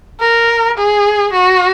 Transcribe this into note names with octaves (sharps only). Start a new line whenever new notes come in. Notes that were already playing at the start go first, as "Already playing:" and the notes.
A#4
G#4
F#4